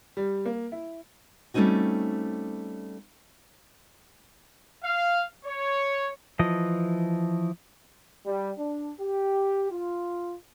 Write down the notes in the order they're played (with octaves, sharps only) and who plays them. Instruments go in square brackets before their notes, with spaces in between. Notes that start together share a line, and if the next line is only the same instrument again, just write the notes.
[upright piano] G3
A#3
E4
[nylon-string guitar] G3 A3 C4 C#4 D#4 F#4
[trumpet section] F5
C#5
[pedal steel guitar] E3 F3 D#5
[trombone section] G3
D4
G4
F4